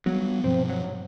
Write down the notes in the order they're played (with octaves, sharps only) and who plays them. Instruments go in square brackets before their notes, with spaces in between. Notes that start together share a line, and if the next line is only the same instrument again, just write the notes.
[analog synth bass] F#3 [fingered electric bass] G3 B3
[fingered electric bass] G2 B2 F3 [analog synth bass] C4
[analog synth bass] F#3